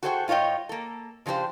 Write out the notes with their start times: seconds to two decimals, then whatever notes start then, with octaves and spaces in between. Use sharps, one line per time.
0.03 F#4 G#4 A4 C5 D#5 G5
0.28 G#2 F4 C#5 D#5 G5
0.69 A#3 A4
1.26 C#3 F3 D4 G4 C5